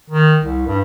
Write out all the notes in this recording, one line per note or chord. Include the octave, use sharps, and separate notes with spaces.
D#3
C2
G2